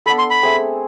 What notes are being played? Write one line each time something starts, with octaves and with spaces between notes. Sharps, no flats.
B3 D4 A4 B5
C6
B5
A3 C4 G#4